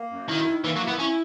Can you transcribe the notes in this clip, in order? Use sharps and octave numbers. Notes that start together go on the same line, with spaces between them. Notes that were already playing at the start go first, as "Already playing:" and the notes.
Already playing: A#3
F#2
D#3 E4
D#3
E3 A#3
F#3
E4
B3
C#4 E4